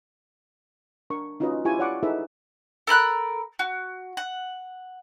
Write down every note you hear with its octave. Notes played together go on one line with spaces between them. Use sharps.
D4 A#4 C#6
C#4 D#4 F4 F#4 B4 D#5
E4 F4 G4 G#5 C#6
C#5 D5 F5 F#5 B5 D6
D#4 E4 G#4 A4 B4 E5
A4 A#4 B5 F#6
F#4
F#5